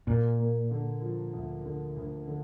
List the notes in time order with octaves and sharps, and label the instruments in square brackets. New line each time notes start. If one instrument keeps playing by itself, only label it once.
[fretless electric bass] A#2 [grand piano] A#3
[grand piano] A#3
D3
F3
D2
D3
D2
D3